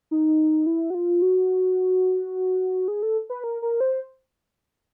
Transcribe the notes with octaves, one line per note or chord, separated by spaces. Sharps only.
D#4
E4
F#4
F4
F#4
G#4
A4
B4
A#4
A#4
C5